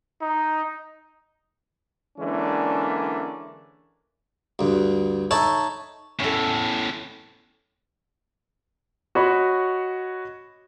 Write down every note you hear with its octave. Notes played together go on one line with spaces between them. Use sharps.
D#4
D3 E3 G#3 A#3 C#4 D4
D2 G2
D#4 A4 C#5 E5 A5 B5
E2 A2 C#4 A4
F#4 C#5 D#5 B5 C#6